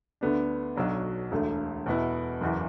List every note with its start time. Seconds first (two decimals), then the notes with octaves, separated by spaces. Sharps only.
0.21 D2 D3 B3 D4
0.76 B1 B2 F#3 D4
1.31 E1 D2 D3 A3
1.86 E2 B2 B3 E4
2.41 F#1 E2 E3